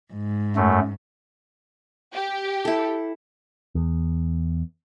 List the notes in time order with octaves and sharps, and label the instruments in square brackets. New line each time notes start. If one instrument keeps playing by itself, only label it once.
[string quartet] G#2
[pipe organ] F#2 A3
[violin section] G4
[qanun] E4 A4
[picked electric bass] E2